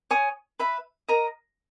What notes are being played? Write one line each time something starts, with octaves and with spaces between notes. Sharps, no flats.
C#5 G#5 D#6
B4 E5 B5
A#4 D#5 A#5